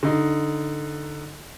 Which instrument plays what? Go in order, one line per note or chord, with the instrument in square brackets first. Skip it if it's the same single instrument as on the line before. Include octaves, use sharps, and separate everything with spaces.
[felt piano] D3 D#4